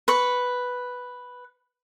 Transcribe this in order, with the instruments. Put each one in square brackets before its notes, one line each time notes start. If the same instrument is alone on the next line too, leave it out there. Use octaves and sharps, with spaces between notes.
[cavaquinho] B4 C#6